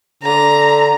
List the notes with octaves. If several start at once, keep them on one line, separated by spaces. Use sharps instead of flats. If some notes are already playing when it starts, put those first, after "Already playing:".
D3 A#5